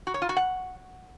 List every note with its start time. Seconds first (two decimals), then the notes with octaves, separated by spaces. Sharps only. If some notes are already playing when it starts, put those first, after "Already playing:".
0.07 F#4
0.14 C#5
0.22 F4
0.29 F#4
0.37 F#5